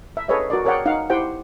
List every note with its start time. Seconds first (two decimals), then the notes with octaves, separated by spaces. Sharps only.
0.17 E5
0.28 G#4 A4 B4 C#5 D#5 E5
0.50 F#4 A#4 D5
0.65 G#4 A#4 C#5 D5 F#5 G5
0.86 D#4 F5 F#5
1.10 E4 G4 C5 F#5 G5